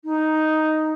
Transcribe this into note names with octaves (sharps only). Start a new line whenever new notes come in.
D#4